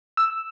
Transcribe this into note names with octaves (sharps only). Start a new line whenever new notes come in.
E6